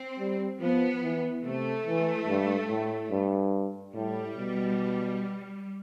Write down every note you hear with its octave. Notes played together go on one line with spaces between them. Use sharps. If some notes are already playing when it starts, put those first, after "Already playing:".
Already playing: C4
G3
F3 B3
E3
C3 A3
E3
G2
A2
G2
A2 G3
B2